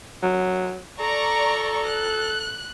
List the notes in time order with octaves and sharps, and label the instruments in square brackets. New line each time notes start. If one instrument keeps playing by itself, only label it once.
[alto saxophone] F#3
[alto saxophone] A4 [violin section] D5 A#5 C#6
[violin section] F#6